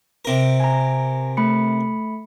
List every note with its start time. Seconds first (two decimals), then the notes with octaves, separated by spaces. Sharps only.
0.25 C3 A#4
0.60 G#5 A#5
1.37 A3 B5 C#7